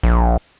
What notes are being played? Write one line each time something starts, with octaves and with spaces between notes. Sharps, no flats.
A#1